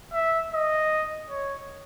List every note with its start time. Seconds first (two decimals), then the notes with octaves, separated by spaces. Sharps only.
0.13 E5
0.53 D#5
1.30 C#5